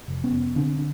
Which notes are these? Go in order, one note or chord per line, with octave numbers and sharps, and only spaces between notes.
F1
B3 C#4
F1
D3 C4 D4
D4